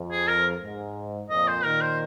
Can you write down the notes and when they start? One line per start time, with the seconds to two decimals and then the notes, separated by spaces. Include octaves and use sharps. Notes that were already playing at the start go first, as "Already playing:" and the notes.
Already playing: F2
0.11 G#4
0.28 A#4
0.62 G#2
1.30 F2 A#2 D#5
1.48 C5
1.64 A#2 D#3 A#4
1.81 C5